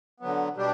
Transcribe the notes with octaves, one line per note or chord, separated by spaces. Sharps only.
D3 F#3 B3
B2 G3 D4 G4